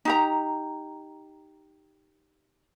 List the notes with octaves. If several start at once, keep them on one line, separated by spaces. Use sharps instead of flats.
D#4 G4 A#5